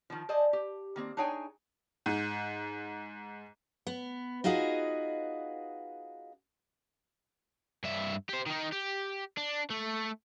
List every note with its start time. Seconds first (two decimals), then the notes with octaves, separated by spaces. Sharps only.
0.10 D#3 F3
0.29 C5 D5 D#5 G#5 A5
0.53 G4
0.96 D#3 A#3 C4
1.17 D4 D#4 G#4 C#5 G5 G#5
2.06 G#2
3.87 B3
4.44 D#4 F4 F#4 G#4 B4 D#5
7.84 G2 E5
8.29 G4 C5
8.46 D#3 D#4
8.72 G4
9.38 D4
9.70 A3